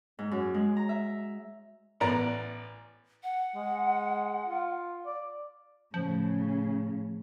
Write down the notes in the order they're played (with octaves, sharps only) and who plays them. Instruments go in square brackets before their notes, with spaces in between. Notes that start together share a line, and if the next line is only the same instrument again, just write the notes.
[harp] G#2
F#2
G#3
A#5
E5
[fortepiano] A1 B3 D5 A#5
[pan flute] F#5
[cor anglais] G#3
F4
D5
[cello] A2 C#3 [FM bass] F3